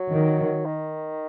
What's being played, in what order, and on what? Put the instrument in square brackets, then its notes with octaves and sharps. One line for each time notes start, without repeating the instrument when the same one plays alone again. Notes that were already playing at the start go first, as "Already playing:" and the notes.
Already playing: [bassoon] F#3
[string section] D#3
[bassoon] D#3